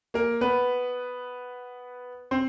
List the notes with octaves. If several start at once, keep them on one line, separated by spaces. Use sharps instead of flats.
A#3 A#4
B3 B4
C4 C5